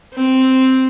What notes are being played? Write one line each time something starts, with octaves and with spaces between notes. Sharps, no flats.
C4